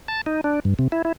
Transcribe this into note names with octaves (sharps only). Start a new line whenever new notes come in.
A5
D#4
D4
G2
C3
E4
E4